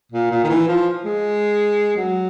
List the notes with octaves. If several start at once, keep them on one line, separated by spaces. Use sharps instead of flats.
A#2
A#2
D#3
E3
F3
G#3
F#3